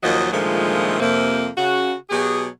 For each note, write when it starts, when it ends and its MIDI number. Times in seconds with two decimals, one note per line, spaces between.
0.03 0.28 39
0.03 0.28 46
0.03 0.28 53
0.03 0.28 54
0.03 0.28 75
0.32 1.00 46
0.32 1.00 50
0.32 1.00 51
0.32 1.00 53
0.32 1.00 56
0.32 1.00 57
1.00 1.47 41
1.00 1.47 48
1.00 1.47 58
1.57 1.93 49
1.57 1.93 66
2.09 2.46 47
2.09 2.46 54
2.09 2.46 67
2.09 2.46 68